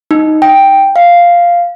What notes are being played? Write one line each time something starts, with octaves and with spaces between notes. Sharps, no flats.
D#4
G5
F5